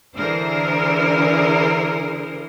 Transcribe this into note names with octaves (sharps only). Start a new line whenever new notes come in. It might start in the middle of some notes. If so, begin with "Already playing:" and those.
D3 E3 G#4 A#4 C5